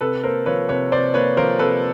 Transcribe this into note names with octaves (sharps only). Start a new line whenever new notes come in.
C3 A4 B4
A#3 A#4 C5
F3 B4 C#5
C3 B4 C#5
C3 C5 D5
A#3 B4 C#5
F3 A#4 C5
C3 A4 B4